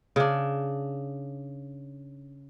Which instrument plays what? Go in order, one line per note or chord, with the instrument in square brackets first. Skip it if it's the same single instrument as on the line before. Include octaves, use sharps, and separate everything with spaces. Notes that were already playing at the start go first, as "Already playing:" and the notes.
[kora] C#3 D4